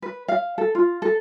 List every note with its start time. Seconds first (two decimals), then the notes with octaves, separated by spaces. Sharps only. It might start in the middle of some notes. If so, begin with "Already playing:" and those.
0.02 B4
0.28 F5
0.58 A4
0.75 F4
1.02 A4